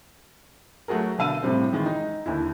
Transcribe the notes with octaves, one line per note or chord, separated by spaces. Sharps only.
F#3 A3 F#4 G#4 A#4
B2 D3 F5 E6 D#7
A2 C3 G3 C4
D#3 E3 G#3
D#4
D#2 D3 E4